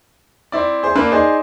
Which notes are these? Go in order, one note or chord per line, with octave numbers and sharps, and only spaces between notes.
C4 E4 D5
G#4 C5
A#3 D4 B4 E5
D#4 G#4 C5 D5